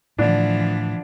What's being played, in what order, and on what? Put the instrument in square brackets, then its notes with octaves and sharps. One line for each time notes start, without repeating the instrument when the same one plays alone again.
[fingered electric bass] A2 [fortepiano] D3 D4 [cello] E3 F3